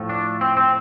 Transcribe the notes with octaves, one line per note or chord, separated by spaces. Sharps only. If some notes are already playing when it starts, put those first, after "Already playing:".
Already playing: A2 F3 A3
D4
C4
C4